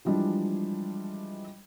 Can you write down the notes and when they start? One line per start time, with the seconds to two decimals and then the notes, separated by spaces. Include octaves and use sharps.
0.05 E3 F3 G3 G#3 D4